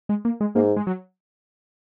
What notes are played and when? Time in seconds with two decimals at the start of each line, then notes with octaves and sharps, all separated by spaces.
0.09 G#3
0.25 A#3
0.41 G#3
0.55 G#2 A#3
0.76 G#3
0.87 F#3